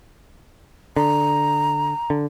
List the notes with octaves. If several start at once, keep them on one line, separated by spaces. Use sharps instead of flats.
D3 A#5
D3